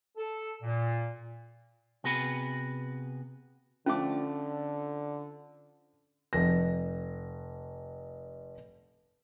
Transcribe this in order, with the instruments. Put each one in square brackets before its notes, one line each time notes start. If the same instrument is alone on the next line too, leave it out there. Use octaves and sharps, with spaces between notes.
[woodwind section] A4
A#2
[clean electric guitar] C3 B3 F#4 G#4 B4
[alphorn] D3 [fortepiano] F3 A3 D6 [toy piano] C#4
[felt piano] F1 A#6